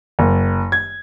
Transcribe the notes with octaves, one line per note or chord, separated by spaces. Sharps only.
F#1
G#6